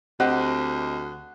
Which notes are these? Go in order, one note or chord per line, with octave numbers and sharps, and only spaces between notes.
D2 C4 G4 D#5 F#5